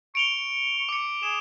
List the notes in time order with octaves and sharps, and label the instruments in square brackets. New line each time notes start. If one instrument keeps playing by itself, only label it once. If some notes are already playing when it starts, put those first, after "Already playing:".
[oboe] C#6 [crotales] D7 F7 G7
[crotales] D6 C#7
[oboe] G#4 [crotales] E7